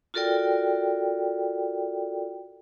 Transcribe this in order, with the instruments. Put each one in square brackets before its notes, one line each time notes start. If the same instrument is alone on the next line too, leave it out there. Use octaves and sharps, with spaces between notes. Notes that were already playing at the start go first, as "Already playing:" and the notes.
[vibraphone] F4 F#4 A4 A#4 D5 G5